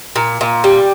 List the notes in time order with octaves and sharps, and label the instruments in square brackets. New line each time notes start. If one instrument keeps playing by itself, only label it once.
[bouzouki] A#2
A#2
G3